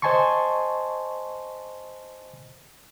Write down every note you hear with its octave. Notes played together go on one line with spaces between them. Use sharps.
C5 D#5 G#5 A5 C6 C#6